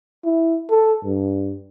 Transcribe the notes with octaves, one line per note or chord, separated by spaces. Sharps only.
E4
A4
G2